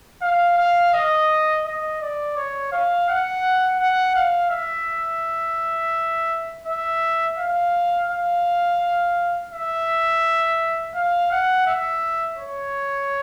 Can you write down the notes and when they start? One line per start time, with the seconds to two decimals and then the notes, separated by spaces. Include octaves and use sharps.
0.22 F5
0.58 F5
0.94 D#5
1.65 D#5
2.01 D5
2.36 C#5
2.72 F5
3.09 F#5
3.80 F#5
4.15 F5
4.51 E5
6.66 E5
7.38 F5
8.09 F5
9.52 E5
10.95 F5
11.31 F#5
11.67 E5
12.38 C#5